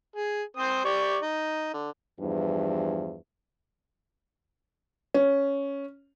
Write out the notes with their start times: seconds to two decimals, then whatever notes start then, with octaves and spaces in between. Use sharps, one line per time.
0.16 G#4
0.57 C4 C5 D#6
0.85 G4 D5 C#6
1.22 D#4
1.73 D3
2.19 E2 G2 E3 F3
5.14 C#4